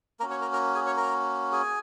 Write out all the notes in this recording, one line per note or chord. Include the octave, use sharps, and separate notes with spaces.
A#3 C#4 F#4 A#4 A#5
C#5 C#6
A#4 A#5
A#4 A#5
G#4 G#5
C#5 C#6
A#4 A#5
G#4 G#5